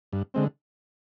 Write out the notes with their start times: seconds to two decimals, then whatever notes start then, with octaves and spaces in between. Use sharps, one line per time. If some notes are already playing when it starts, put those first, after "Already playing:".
0.13 G2
0.34 D3 G#3 C4